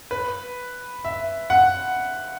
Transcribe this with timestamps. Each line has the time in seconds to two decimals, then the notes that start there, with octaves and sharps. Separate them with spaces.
0.11 B4
1.05 E5
1.50 F#5